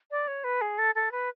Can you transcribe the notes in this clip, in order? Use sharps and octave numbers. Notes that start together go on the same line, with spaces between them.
D5
C#5
B4
G#4
A4
A4
B4